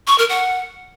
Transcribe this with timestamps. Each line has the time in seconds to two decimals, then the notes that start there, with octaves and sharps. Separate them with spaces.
0.07 C#6
0.18 A#4
0.29 F#5